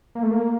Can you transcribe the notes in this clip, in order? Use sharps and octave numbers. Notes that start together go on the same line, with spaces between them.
A#3
A3
A#3